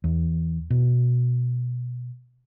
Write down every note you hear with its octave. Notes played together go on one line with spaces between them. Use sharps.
E2
B2